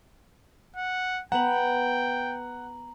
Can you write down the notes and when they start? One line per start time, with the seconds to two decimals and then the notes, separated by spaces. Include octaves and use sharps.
0.76 F#5
1.32 B3 B4 F#5 G5 A#5 F#7